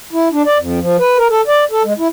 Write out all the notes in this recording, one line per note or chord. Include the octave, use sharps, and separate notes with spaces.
E4
D4
D5
F2
F3
B4
A#4
A4
D5
A4
G#3
E4